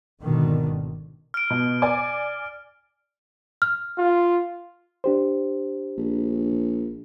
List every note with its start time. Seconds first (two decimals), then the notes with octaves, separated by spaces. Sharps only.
0.21 G#1 B2 D3 D#3
1.34 F6 D7
1.50 B2
1.82 D5 G#5 D6
3.62 F6
3.98 F4
5.04 D4 G4 C5
5.98 A#1